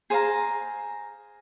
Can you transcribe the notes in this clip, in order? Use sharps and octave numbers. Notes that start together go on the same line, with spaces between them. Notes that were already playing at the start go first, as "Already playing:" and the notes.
G#4 C5 F5 A#5